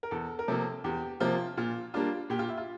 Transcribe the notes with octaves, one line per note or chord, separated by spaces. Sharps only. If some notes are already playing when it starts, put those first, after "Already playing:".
A#4
E2 A4
A#4
C3 F3 A#3 A4
E2 G4
C3 F3 A#3 F4
A#2 F4
G3 A#3 D4 F4
A#2 G4
F4
E4
F4